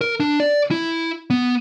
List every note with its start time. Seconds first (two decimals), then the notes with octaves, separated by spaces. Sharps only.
0.01 A#4
0.20 D4
0.40 D5
0.71 E4
1.30 B3